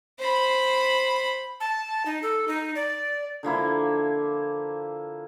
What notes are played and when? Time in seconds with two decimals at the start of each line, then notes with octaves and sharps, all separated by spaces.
0.20 C5 B5
1.60 A5
2.06 D#4
2.22 A4
2.48 D#4
2.75 D5
3.43 D3 F3 A#3 E4